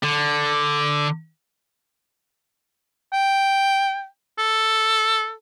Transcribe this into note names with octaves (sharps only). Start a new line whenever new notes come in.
D3
G5
A4